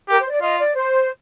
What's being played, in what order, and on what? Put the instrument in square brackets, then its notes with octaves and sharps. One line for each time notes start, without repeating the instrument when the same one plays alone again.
[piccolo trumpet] G4 [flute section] A#4
[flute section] C5
D5
[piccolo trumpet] F4 [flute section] D#5
[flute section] D5
C5